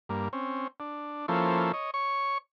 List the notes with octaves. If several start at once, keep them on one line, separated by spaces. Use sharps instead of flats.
G2 A#3
C4 C#4
D4
F3 A#3 C#4 E4 A4 C5
C#5 D#5
C#5 C#6